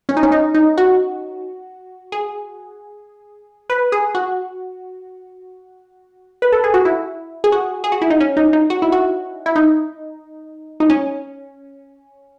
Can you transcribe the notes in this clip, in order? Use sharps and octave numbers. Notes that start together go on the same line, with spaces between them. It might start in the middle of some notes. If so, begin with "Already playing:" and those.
C#4
D#4
C#4
D#4
D#4
F#4
G#4
B4
G#4
F#4
B4
A4
G#4
F#4
E4
G#4
F#4
G#4
F#4
E4
D#4
C#4
D#4
D#4
F#4
E4
F#4
E4
D#4
D#4
C#4